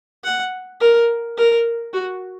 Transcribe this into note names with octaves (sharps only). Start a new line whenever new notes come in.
F#5
A#4
A#4
F#4